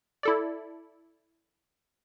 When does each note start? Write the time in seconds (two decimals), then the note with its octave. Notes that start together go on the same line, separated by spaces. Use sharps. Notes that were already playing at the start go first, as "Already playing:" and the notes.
0.23 E4 A4 D5